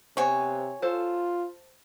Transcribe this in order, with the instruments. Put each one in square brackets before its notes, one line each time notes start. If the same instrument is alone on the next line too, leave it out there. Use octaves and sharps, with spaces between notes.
[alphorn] C3 [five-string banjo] B3 C5 [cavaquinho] C#5 G#5
[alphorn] F4 [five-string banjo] A4 C5